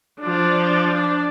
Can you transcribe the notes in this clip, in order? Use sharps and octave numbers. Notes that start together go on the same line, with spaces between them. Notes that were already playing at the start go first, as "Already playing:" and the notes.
F3 D4
D4